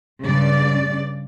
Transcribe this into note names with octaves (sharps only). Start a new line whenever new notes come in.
G2 C#3 D5